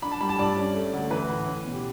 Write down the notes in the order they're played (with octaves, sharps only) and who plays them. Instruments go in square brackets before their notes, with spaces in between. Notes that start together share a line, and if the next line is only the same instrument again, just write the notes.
[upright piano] D4 B5
A5
G3 B5
A5
G2 D5
C#4
A3
D2
E3 B4
A2
C#4
B2
G4